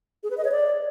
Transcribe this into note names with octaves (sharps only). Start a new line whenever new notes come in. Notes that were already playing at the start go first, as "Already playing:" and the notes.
G#4
B4
D#5
C#5
D5